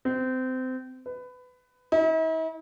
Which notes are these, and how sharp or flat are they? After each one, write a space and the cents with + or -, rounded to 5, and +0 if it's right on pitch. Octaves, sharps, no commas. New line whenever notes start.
C4 -25
B4 +20
E4 -45